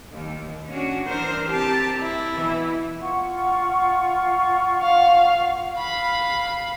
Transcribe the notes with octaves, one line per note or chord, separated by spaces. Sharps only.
D#2
C#4 D4 F#4
E3 D4 A#4 C5
C4 G4 A5
E4
B2 E3
F4 F#5 C#6
F5
F5 B5